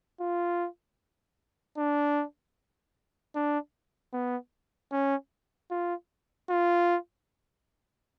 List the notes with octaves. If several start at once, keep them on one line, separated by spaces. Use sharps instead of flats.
F4
D4
D4
B3
C#4
F4
F4